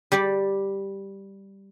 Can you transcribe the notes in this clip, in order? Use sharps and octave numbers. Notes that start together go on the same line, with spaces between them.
G3 G4 D5